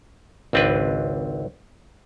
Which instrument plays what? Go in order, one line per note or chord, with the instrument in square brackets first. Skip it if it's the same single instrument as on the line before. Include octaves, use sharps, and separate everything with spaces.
[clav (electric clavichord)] G#1 C#2 C4 D4 B4